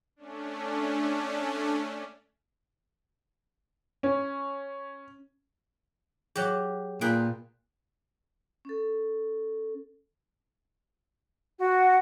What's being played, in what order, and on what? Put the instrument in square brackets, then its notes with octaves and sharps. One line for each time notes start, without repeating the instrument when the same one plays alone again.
[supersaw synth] A3 C#4 D4
[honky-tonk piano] C#4
[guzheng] F#3 G4 [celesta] G#4 C#5
[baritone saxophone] A#2 [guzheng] G#4 B4 G5
[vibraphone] C#4 A4
[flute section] F#4